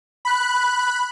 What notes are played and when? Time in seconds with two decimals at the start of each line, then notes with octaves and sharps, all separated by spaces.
0.25 B5 F#6